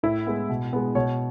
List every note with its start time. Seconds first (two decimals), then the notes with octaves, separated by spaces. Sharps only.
0.03 A2 E4
0.27 G#3 B3
0.49 B2
0.73 G#3 B3
0.95 B2 C#5